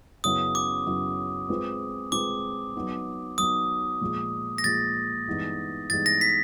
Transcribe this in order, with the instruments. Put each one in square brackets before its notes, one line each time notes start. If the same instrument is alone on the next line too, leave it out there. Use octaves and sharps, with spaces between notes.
[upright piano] F#2 C#3 F#3 B3 E4 [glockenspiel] D#6
[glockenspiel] D6
[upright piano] F#2 C#3 F#3 B3 E4
G#3 C4 F4 G#4 B4
[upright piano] G#3 C4 F4 G#4 B4 [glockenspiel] D6
[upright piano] F#3 B3 D#4
[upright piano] F#3 B3 D#4 [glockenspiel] D#6
[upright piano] A#2 F3 G#3
[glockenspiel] A#6
[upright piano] A#2 F3 G#3 [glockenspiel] A6
[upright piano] G2 E3 G#3 B3 D#4
[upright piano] G2 E3 G#3 B3 D#4 [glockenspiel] A6
[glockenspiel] A#6
B6